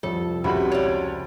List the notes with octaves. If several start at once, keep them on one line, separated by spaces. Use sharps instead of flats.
C2 F2 A4
C#2 C3 E4 F#4 B5
C#5 D5